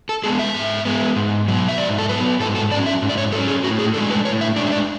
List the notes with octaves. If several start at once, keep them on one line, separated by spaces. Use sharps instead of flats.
A4
G#3 B3 G#4
E5
G#2
G#3 B3
G#2
F#3 B3
E5
G#2 D5
A4
F#3 B3 B4
G#2 A4
A4
F#3 C#4 D5
E5
G#2
D5
C#5
F#3 C#4 A4
G#4
A2 F#4
G#4
G#3 D4 A4
B4
A2 C#5
E5
G#3 D4 D5
E5
D5